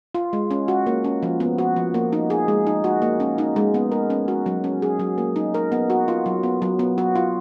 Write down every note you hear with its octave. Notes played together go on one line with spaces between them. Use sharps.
F4
G#3
C#4
F#4
A#3
C#4
F3
B3
F#4
F3
A#3
D#4
G#4
G#3
D#4
F#4
A#3
C#4
D#4
G#3
B3
A#4
C#4
F#4
F#3
C#4
G#4
F#3
A#3
D#4
A#4
B3
F#4
F4
F#3
B3
F#3
B3
F#4
F4